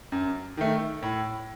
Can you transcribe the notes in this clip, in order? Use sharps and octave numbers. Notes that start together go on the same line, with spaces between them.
F#2
D#3 A3
A2